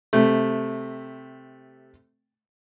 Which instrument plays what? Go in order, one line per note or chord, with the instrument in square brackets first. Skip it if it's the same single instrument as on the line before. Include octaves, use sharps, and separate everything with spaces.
[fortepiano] C3 A3